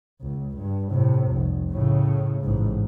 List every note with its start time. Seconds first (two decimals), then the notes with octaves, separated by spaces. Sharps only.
0.21 C#2
0.57 G2
0.91 A2 C3
1.28 F1 C2
1.71 A2 C#3
2.41 A1 G#2